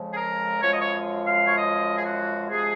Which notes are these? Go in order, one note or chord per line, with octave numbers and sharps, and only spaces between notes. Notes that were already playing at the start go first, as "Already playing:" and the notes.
Already playing: F2 C#3 F3 G#3
G#4
A#4
F#2 F3 G#3 C#5
D#5
C#5
F5
C#5
D#5
G#4
F#4
C3 F3 G#3 G#4